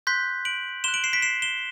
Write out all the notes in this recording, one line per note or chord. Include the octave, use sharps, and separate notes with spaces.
C6 F#6 G6 B6
D7 F#7
C6 F#6 E7 G7
D7 F#7
C7 E7
B6 D7
C7 E7
E7 G7